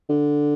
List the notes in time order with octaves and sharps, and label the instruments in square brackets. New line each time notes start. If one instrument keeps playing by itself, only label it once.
[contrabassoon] D3